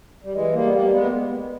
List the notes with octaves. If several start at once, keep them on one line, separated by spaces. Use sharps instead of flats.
G3
E3 G#3
G3 A#3
B3
G3 A#3
A#3
G#3 B3